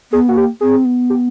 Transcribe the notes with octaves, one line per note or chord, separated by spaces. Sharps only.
B3 G#4
A#3 F#4
G4
C4 G#4
B3
G4